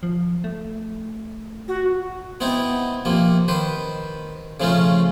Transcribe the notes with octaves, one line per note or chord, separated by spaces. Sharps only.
F3
A3
F#4
B3 C4 D#4 E4
C3 F3 A#3
D#3 B4 C5
C#3 F3 A3 C#4 F4